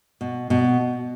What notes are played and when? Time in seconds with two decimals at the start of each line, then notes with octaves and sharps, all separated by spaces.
0.21 B2
0.50 B2